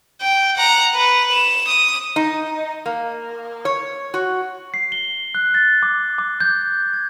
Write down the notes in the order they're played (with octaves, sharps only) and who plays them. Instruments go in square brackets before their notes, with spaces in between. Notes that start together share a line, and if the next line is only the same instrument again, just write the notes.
[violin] G5
F#5 A#5
B4
E7
D#6
[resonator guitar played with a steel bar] D#4
A#3
C#5
F#4
[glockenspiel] C7
G7
F#6
A6
D6
D6
G6
G#6